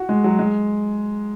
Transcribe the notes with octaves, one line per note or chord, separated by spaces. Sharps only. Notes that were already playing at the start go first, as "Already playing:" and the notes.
Already playing: F#4
G#3
F#3
G#3